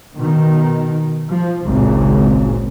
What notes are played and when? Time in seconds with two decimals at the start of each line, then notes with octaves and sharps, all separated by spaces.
0.18 B2 D#3
1.28 F3
1.66 G#1 C#2 A#2 C#3